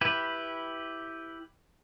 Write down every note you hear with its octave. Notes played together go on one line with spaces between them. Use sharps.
E4 G4 B4